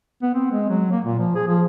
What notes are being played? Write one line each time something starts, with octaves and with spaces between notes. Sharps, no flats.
B3
C4
G#3
F#3
A#3
A#2
F3
G#4
F3